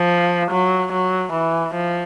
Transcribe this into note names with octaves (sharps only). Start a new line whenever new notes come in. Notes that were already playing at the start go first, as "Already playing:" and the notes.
Already playing: F3
F#3
F#3
E3
F3